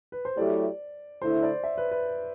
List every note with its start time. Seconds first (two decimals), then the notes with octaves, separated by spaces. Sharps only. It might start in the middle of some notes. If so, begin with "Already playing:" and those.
0.12 B4
0.25 C5
0.37 F#3 A3 E4 G4 D5
1.22 D3 A3 E4 C5
1.43 D5
1.64 E5
1.78 B4
1.91 B4